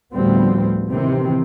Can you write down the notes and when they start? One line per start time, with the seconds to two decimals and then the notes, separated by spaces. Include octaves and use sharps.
0.13 D2 A2 F3 G3 B3 C4
0.91 C3 D#3 E3 C4